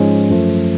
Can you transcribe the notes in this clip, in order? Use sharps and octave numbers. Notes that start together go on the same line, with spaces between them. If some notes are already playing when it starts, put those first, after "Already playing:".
Already playing: G#2 F3 G#3 C#4
F#2 F3 A3